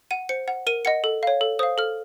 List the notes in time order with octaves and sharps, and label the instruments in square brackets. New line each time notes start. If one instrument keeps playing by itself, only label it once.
[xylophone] F#5 D#7
C5 C#7
F#5
A#4 D#7
D#5 F#5 C#7
A4
C#5 F5
A4
C5 F5 D#6
A4 F6